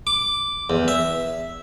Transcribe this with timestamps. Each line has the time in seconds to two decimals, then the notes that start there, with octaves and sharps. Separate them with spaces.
0.07 D6
0.70 E2
0.88 E5